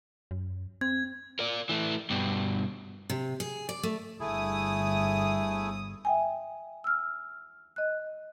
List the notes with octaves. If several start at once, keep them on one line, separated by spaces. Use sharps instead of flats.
F#2
C4 G#6
A#4 D5
E3 A3
G2 B2
C3
G#4
D5
A3
G1 A3 E4 G#4 D#6
E5 G5 G#5
E6 F6
D#5 F#6